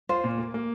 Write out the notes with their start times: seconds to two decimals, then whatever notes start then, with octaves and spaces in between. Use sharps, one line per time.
0.09 F4 C5
0.24 A#2
0.38 A#3
0.54 A#3